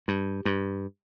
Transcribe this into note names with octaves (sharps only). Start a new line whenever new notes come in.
G2
G2